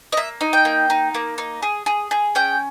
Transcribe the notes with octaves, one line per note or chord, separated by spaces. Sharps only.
D#5
A#3 E5
D#4
G5
A#3
D#4
A#3
D#4
G#4
G#4
G#4
C#4 G5